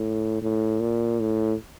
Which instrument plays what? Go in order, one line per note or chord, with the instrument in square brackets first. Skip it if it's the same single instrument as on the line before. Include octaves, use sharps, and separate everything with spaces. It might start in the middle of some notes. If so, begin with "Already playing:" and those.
Already playing: [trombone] A2
A2
A#2
A2